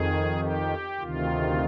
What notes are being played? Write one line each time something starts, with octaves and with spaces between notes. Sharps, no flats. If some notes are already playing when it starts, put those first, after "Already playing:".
Already playing: F2 D#3 G#4
G4
D2 C3 D#3 F4